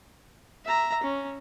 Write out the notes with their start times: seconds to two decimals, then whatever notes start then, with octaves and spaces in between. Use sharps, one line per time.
0.65 E5 A#5
1.03 C#4